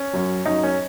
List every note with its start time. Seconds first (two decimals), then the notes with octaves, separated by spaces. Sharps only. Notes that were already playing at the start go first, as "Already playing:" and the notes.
Already playing: C#4
0.13 F#2 F#3
0.45 F#2 F#3 D#4
0.63 C#4